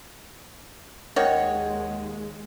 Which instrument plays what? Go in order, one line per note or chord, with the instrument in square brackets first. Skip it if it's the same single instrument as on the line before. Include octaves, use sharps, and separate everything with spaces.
[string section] D#2 G#3 [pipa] D#3 F#4 C#5